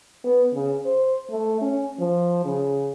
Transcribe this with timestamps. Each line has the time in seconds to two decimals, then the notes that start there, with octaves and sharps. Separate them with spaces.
0.24 B3
0.54 C#3
0.85 C5
1.30 A3
1.62 C#4
1.99 F3
2.45 C#3